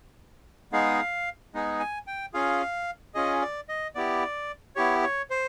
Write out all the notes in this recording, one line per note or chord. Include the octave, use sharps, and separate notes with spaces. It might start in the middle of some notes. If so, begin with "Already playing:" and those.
G#3 B3 D#4 G#4 F5
G#3 B3 D#4 G#4
G#5
G5
C#4 F4 G#4 F5
C#4 F4 G#4 D#5
D5
D#5
B3 E4 G4 D5
B3 E4 G4 C#5
C#5
C5